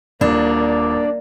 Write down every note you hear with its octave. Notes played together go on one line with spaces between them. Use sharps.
D#1 A#3 D4 D5